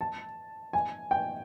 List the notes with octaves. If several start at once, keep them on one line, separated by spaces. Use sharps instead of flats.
A5
G#5
G5